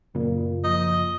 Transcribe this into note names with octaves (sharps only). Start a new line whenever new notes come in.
F#2 A#2 C#3
F3 D#5